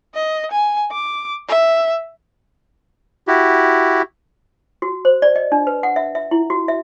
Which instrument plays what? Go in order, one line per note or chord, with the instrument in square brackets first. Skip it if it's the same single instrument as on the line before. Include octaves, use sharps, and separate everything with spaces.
[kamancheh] D#5
G#5
D6
E5
[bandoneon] E4 F#4 G4
[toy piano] F#4
C5
D5
D#5
D4
B4
F#5
E5
E5
E4
F#4
E5